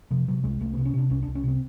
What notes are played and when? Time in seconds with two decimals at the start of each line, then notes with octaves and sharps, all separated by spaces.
0.11 C3 F3
0.28 C3 F#3
0.44 C2 G#3
0.60 C2 A3
0.73 C3 B3
0.85 C#4
0.94 C3 D4
1.10 C2 C#4
1.23 C2 D4
1.35 C#4
1.44 C3 C4